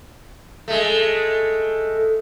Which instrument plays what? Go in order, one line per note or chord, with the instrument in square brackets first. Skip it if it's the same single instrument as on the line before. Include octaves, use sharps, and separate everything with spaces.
[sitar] G#3 A3